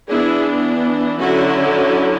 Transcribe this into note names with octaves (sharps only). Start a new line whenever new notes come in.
E3 B3 D4 E4 G#4
D3 F#3 C#4 E4 F#4